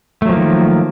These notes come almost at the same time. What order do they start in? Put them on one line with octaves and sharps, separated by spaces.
A3 F#3 F3 A#3 D#3